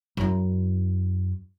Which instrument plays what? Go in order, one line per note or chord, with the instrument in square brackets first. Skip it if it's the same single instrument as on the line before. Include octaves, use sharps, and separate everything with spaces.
[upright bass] F#2 E4